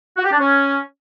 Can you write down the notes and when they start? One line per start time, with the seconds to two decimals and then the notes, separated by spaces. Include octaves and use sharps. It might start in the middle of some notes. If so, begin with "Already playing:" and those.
0.17 F#4
0.24 G4
0.32 D4
0.39 C#4